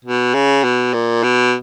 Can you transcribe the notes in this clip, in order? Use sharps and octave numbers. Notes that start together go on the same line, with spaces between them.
B2
C#3
B2
A#2
B2